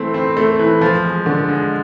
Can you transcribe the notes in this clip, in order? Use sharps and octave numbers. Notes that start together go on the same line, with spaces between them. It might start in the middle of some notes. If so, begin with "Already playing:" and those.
Already playing: E3 A3 C4
C4
A3
E3
F3
G#3
D3
G#3